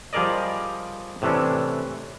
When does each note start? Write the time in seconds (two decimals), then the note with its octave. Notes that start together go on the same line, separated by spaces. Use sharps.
0.13 F3 G3 G#4 A#4 D5 D#5
1.22 A2 C3 E3 C#4 D4